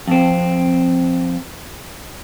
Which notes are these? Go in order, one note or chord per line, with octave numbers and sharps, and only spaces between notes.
F2 C4